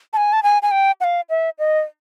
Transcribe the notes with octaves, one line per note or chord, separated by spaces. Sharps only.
A5
G#5
A5
G#5
G#5
G5
F#5
F5
E5
D#5